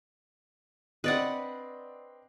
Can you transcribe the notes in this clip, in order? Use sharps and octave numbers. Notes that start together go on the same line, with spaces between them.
C4 D4 B4 D5 D#5 F#5